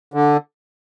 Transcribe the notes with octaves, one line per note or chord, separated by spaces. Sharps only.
D3